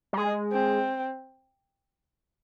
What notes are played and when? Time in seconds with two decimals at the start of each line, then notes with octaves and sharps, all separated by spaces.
0.13 G3
0.17 G#3 G#4
0.52 C4